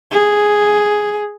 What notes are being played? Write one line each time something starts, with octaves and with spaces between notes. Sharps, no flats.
G#4